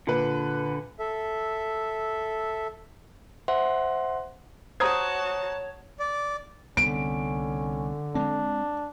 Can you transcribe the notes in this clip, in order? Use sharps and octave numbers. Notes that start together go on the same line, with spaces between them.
A#2 D3 B4
A4 E5
C5 E5 F#5 C6
F#4 C5 C#5 A5 A#5 D#6 G#6
D5
C2 D3 B3 C#4 D7
G#3 A3 C4 D4